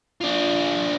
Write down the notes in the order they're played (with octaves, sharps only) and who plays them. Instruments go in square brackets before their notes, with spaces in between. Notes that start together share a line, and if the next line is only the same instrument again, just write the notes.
[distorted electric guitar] D4 F4